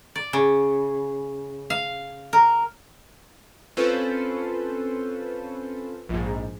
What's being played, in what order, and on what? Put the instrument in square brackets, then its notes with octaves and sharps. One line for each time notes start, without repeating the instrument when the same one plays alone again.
[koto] D5
C#3
F5
A#4
[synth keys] C4 C#4 F4 A4 B4 C5
A#1 G#2